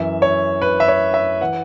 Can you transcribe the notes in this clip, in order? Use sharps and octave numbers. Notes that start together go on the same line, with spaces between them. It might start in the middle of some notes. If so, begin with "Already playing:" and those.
Already playing: F#2 E3 E5
C#5
B4
E5
C#5
E5
E3 F#5